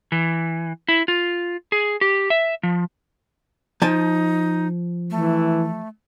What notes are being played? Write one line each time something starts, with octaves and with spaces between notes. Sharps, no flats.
E3
E4
F4
G#4
G4
E5
F3
F3 D#4 G#5 A5
E3 A3